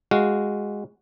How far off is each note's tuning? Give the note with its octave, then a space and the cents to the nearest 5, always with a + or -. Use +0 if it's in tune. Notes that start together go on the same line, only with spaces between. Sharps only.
G#3 -10 F#4 +0 F5 +0